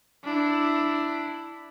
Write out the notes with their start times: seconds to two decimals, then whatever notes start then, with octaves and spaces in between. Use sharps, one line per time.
0.24 D4 E4